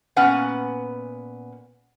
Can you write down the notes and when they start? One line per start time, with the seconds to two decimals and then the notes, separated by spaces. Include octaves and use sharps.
0.16 A#2 B3 C#4 B4 F#5 G#5